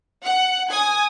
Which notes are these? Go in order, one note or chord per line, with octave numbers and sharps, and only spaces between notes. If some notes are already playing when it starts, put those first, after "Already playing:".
F#5
G#5 D#6